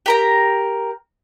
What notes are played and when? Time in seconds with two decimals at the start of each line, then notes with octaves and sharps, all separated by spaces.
0.06 G4 A#4 A#5